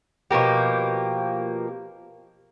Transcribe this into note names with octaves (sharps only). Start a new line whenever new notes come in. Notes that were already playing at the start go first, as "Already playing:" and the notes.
B2 F3 A#3 G4